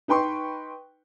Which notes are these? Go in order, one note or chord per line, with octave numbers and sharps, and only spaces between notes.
D#4 B4 G5 C6 C#6